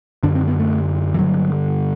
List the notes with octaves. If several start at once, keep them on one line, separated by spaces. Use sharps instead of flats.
F#2 D3 D4
C4
B3
A3
E3
G2 D3 F#3